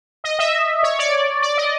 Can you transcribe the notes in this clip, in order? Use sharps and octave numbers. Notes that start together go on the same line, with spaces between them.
D#5
E5
C#5
D5
D5
D#5